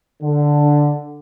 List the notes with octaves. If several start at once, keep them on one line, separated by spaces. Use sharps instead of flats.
D3